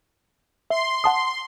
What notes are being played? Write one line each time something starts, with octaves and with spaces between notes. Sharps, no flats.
E5 C6
F#5 A5 D#6